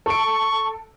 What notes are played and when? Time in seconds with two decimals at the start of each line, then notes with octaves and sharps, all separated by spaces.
0.06 A4 C#6 D7